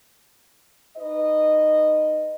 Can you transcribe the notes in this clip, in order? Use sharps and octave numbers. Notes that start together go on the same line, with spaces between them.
D#4 B4 D#5